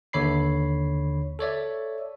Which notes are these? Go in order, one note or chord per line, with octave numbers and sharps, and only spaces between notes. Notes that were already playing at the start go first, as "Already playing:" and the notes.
D#2 D3 C#5 B5 C7
A4 C#5 D5 E5